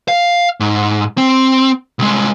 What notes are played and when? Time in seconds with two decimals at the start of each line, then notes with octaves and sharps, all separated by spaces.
0.08 F5
0.60 G#2
1.18 C4
1.99 C2 G#3